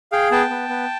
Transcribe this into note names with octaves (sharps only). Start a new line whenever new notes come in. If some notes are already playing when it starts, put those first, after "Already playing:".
G#4 F5 G5
B3 G5 A5
B3
B3